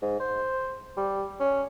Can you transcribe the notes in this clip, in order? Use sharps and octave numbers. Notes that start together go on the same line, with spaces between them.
G#2
C5
G3
C#4